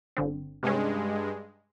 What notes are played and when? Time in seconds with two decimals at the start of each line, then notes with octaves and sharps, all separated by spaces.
0.17 G1 D3 C4
0.63 G2 C3 G#3 C#4